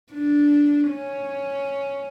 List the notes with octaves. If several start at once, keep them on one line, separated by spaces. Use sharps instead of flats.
D4
C#4